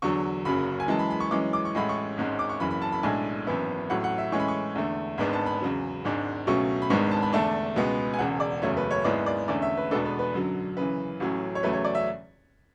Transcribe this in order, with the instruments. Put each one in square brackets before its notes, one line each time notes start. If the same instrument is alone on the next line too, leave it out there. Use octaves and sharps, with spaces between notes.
[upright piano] E2 D3 F#3 C#6
F#1 F#2 C#3 F#3 B5
G#5
F#2 E3 G#3 A5
B5
B5
C#6
F#2 E3 G#3 C#4 D6
D6
C#6
A1 A2 G#3 B5
C#6
G#1 G#2 G#3 C#4
D6
C#6
F#1 F#2 E3 B5
B5
A5
B5
B1 A2 G#3 D4 G#5
G#1 F#2 E3 B3 E4
A1 A2 F#3 F#5
F#5
E5
A2 E3 G#3 C#4 C#6
B5
C#6
E2 D3 A3
G#1 G#2 G#3 B3 D4 B5
A5
B5
E2 C#3 F#3
G#1 G#2 G#3 D4
C#2 B2 F#3 A3 C#4 C#6
B5
G#1 G#2 G#3 B3 D4 C#6
A5
B5
E2 D3 A3 D4 A5
C#2 B2 G#3 B3
G#5
E1 E2 C#3 F#5
D5
F#1 E2 C#3 F#3 A3 C#5
B4
C#5
G#1 G#2 G#3 B3 E4 D5
D5
E2 D3 A3 C#4 D5
E5
B4
E2 B2 G#3 B3 D4 A4
B4
B4
F#2 D3 F#3
F#2 C#3 E3 B4
A1 A2 F#3 C#4
C#5
E2 C#3 F#3 A3 B4
C#5
D5
E5